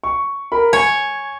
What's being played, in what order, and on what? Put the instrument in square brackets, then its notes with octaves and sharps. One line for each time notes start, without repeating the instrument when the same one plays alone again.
[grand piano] C#6
A#4 B5
[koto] C#5 [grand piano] G#5